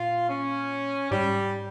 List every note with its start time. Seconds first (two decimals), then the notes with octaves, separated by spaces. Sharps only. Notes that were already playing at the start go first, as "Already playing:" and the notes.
Already playing: A#2 F4
0.29 C#4
1.11 G#2 G3